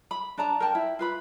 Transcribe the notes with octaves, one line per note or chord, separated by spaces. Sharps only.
B5
D4 D5 A5 A#5
A#4 D5 G5 A5
E4
F4 B4 B5